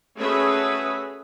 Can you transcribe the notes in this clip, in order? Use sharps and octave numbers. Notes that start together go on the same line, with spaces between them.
A3 C#4 F#4 G#4 B4 E5